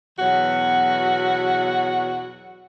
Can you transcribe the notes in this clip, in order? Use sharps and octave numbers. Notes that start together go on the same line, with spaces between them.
E2 B2 F#3 F#4 C#5 F#5